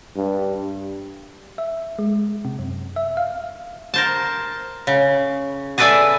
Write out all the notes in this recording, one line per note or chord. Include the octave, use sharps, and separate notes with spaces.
G2
E5
G#3
C3
F#2
E5
F5
A#4 C5 A5
C#3
G#4 A4 B4 D5 E5 G#5